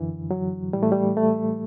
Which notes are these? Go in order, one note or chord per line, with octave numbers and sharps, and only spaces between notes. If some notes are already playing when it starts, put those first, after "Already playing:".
Already playing: F#2 D3 E3
F#3
A2 E3 G3
A3
G3
A3